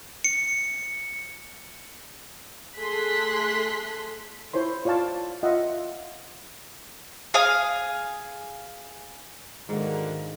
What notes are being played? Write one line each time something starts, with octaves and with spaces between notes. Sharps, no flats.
C#7
A3 G#4 A4 C6 F#6 B6
E4 C5 C#5 C6
F4 C#5 D5 F5 A5
F4 D#5 E5 F#5
G#4 F5 D#6
G#2 D3 D#3 A#3 F#4